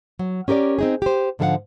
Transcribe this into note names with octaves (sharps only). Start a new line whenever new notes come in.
F#3
C#4 G4 A#4 C#5 D5
C4 D#4 G#4
G4 C5
G#2 D3 F3 A4 F5 F#5